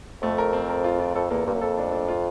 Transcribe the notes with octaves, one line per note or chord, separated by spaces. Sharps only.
F2 A3
A#4
C4
A#4
F4
F4
F2 A4
E2 A#3
G2 A#3
F#2
F2 A4
D4
D4
F4